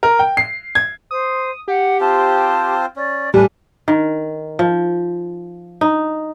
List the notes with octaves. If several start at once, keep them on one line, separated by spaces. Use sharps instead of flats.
A#4
G5
C7
G#6
C5 D#6
G4 F#5
C4 F4 C5 A5
C#4 D5
A2 G3 D4 B4 G#5
D#3
F3
D#4